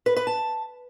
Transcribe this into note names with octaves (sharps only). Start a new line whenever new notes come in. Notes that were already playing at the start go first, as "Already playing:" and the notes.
B4
B4
A5